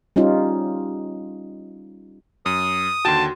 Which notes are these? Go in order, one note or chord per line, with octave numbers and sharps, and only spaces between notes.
G3 C#4 D#4 F4
F#2 D#6
D#2 D3 F#4 G5 A5 C6